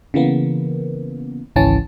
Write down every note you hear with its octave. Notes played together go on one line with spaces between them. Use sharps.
C#3 E3 A#3 B3
G#1 C#2 E3 C#4 A5